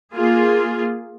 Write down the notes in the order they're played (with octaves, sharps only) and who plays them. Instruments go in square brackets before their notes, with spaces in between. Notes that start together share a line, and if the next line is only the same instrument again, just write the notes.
[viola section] A#3 F4 G#4